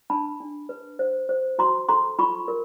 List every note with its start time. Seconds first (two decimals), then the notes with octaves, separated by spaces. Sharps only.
0.10 D4 A5 B5
0.40 D4
0.69 B4
0.99 C5
1.29 C5
1.58 F#4 A#5 C6
1.89 A4 A#5 C6
2.19 F4 B5 C#6
2.48 A#4